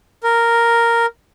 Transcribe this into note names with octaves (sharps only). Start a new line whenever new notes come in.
A#4